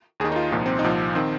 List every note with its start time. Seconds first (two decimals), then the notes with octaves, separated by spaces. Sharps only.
0.20 D#2 G#4
0.24 D#3
0.32 D#4
0.36 F4
0.52 C2 A#2 F3 D#4
0.66 C4
0.79 D#4
0.84 C2 A#2 F3
1.15 D#3 C4